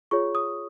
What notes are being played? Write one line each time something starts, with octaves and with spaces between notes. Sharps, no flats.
F4 G#4 C#5 C#6
D#6